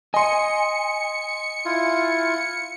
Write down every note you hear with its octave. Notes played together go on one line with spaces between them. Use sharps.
D#5 G#5 C6 C#7
E4 F4